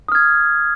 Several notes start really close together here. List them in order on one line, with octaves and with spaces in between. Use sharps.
D#6 F6 G#6